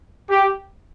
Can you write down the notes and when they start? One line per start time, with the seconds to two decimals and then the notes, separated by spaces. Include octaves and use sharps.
0.30 G4